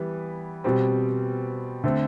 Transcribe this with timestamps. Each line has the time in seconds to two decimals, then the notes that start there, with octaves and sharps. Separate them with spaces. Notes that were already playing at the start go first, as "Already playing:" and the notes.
Already playing: E3 G3 B3
0.64 B2 G3 C4
1.84 D3 A3 C4